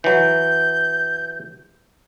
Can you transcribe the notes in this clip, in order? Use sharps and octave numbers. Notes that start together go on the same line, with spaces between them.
E3 F#3 G6